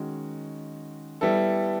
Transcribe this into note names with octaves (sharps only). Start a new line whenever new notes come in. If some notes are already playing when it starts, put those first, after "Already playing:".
Already playing: D#3 G#3 C#4 F#4
G3 B3 E4 A4